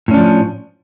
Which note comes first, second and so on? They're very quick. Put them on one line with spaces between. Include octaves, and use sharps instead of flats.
A2 C#4 D4 F3